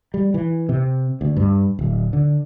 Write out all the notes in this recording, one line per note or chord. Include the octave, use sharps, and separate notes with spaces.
G3
E3
C3
D2
G2
D1
D3